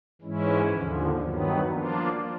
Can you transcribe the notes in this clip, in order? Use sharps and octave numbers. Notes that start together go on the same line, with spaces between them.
G#2 E3 G#3 C#4 E4
D#2 D3 F3
G2 D#3 F#3 B3
F3 A#3 D4 F4